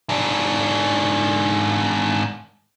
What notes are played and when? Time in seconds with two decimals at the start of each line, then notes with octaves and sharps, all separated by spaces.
0.09 G#2 D4